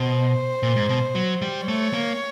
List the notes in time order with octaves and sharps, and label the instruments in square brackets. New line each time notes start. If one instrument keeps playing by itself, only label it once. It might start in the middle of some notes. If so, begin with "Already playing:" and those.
Already playing: [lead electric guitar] B2 [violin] C5
[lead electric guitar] A#2
G#2
B2
F#3
G3
[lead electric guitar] A3 [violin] C#5
[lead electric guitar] A#3